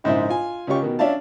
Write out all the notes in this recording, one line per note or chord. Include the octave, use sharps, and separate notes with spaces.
A#1 G#2 C#3 E4 C5 E5
F4 G#5
C#2 C#4 F4 G4 C#6
B2 D#3
C#4 D4 E5 F5 A5